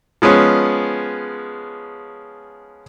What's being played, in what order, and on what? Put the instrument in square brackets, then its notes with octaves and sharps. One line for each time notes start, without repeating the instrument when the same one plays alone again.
[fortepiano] F3 G#3 B3 C#4